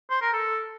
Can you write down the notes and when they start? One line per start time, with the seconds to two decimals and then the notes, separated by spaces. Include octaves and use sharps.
0.10 C5
0.22 A#4
0.33 A4